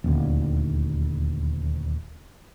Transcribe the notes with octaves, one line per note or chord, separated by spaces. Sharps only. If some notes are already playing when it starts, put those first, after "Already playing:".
D#1 D2